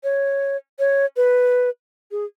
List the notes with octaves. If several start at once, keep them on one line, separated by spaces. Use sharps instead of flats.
C#5
C#5
B4
G#4